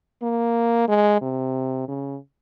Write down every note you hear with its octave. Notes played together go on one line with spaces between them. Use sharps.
A#3
G#3
C3
C#3